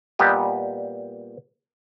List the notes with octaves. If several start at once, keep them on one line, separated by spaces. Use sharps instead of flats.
A#2 G3 B3 G4 D#5